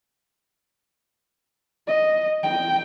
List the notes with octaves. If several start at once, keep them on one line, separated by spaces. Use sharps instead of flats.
D#5
G5